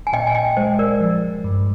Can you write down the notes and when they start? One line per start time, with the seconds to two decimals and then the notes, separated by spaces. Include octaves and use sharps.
0.07 G#5
0.13 A#2 D#5 G5
0.27 G#5
0.35 D#5 G5
0.57 G#3 C5 D#5
0.79 A#4 D5
1.00 F3
1.44 G2